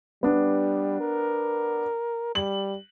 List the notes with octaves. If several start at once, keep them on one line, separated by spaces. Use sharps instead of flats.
G3 B3 D4
A#4
G3 F#7